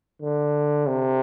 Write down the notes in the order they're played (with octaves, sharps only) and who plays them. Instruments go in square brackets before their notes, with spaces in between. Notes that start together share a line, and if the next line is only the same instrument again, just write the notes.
[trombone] D3
C3